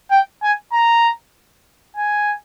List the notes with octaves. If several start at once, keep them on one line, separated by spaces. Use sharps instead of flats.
G5
G#5
A#5
G#5